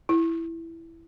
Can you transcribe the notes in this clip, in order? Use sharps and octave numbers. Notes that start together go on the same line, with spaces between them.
E4